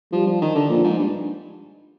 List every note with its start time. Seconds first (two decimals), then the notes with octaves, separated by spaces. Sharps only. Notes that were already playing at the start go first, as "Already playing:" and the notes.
0.12 F3 G3
0.27 F3
0.42 D#3
0.55 D3
0.70 A#2 F3
0.84 G#2
0.98 G2